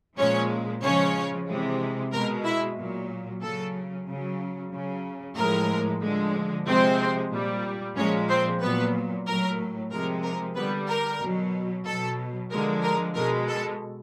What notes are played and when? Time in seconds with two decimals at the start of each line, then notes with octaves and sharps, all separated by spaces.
0.18 A#2 F3 G#3 C#4 C#5
0.82 C#3 F3 G#3 C#4 C#5
1.47 C3 E3 G#3
2.13 B2 G#3 A#4
2.45 E4 E5
2.77 A#2 F#3
3.42 C#3 F#3 A4
4.08 C#3 F#3
4.72 C#3 F#3
5.36 A2 F3 G#3 A#4
6.01 D3 F3 G#3
6.66 C3 F3 G#3 C4 C5
7.31 A#2 G3
7.96 A#2 F3 G#3 C#4 C#5
8.29 C4 C5
8.61 A#2 F#3 B3 B4
9.27 A2 F#3 A#4
9.91 C3 F3 G#3 A#4
10.23 A#4
10.55 D3 G3 B3 B4
10.88 A#4
11.20 B2 F#3
11.85 B2 F#3 A4
12.51 D3 F3 G#3 A#4
12.83 A#4
13.15 B2 G#3 A#4
13.48 A4